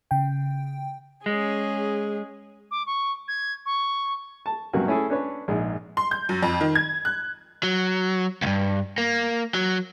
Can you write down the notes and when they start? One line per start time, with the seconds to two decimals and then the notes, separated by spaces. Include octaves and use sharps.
0.11 C#3 G5
1.26 G#3 C#4 G#4
2.71 D6
2.86 C#6
3.28 G#6
3.65 C#6
4.46 A5
4.73 G2 C3 F#3 A#3 C#4 F#4
4.87 A3 C#4 E4 G#4 A4
5.10 C#4 D4 B4 C#5
5.48 A#1 G#2 G#3
5.97 C6
6.11 G6
6.29 F#2
6.43 F2
6.61 D#3
6.75 G#6
7.05 F#6
7.63 F#3
8.42 C#2 G2
8.98 A#3
9.54 F#3